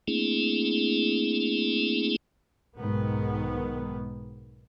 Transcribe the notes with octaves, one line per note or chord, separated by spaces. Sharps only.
A3 A#3 C4 D4 E4 G#4
B1 G#2 D#3 B3